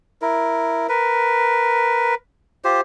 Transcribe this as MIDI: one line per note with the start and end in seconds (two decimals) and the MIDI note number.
0.22 0.87 64
0.22 0.87 70
0.89 2.15 70
0.89 2.15 71
2.65 2.81 65
2.65 2.81 67
2.65 2.81 72